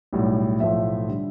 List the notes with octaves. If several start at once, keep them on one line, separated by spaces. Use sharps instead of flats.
B1 A2 G3
B1 A2 F3 A3 E5
D3 G3